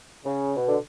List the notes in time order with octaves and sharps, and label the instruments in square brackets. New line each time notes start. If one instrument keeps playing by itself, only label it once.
[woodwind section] C#3
B2
D3